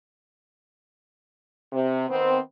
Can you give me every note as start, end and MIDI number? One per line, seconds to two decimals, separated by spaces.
1.73 2.05 48
2.09 2.37 51
2.09 2.37 59
2.09 2.37 60